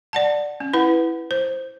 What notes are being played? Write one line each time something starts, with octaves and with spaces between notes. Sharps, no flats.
D5 F#5 A5
C#4
E4 B4 F#5
C5